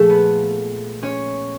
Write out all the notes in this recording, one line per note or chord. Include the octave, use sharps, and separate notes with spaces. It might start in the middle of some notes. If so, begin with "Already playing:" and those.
Already playing: A#2 F3 G#3 A3 A4
B3 B4
C#4 C#5